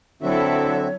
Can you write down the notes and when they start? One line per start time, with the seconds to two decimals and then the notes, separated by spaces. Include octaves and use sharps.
0.22 D3 F#3 C4 E4 F#4 A4 C#5 E5